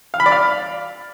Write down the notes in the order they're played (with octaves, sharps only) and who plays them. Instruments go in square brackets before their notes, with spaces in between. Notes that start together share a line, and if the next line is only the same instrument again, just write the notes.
[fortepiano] F5
B5
D5
F5